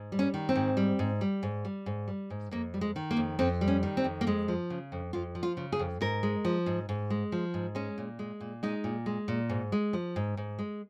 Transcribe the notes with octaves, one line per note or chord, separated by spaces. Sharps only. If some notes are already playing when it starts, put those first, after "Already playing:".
Already playing: G#2
G3
C#4
D#3
C4
G#2
G3
G#2
G3
G#2
G3
G#2
G3
G#2
F2 A#3
G3
G#3
D#3
A#3
F2
F2 C4
G3
C#4
D#3
C4
F2
A#3
F2 G#3
F3
C#3
F2
F2 F4
F3
F4
C#3
G#4
F2
G#2 A#4
G#3
F3
G#2
G#2
G#3
F3
G#2
G#3 C#4
A#2
G#3
A#2
G#3 D#4
A#2
G#3
A#2
G#2
G#3
F3
G#2
G#2
G#3